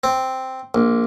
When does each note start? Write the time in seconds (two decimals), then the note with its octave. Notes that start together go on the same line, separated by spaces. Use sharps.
0.04 C4
0.75 A#1